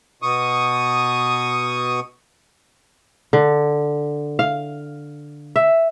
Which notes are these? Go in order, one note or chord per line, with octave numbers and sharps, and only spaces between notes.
B2 C#6 D#6
D3
F5
E5